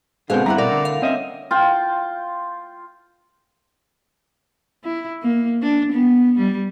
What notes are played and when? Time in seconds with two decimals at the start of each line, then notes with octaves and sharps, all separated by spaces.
0.30 B2 D3 G#3 C4 C5 F5
0.46 G3 A3 E4 F#5 A#5
0.58 B2 A#4 D5
0.71 D3
0.85 F5
1.02 C4 C#4 D#5 E5
1.51 F4 G5
4.84 E4
5.22 A#3
5.62 D4
5.92 B3
6.38 G3